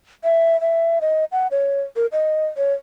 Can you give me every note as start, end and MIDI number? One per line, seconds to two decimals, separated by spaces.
0.24 0.59 76
0.61 0.99 76
1.01 1.25 75
1.32 1.47 78
1.51 1.82 73
1.96 2.06 70
2.12 2.46 75
2.57 2.73 73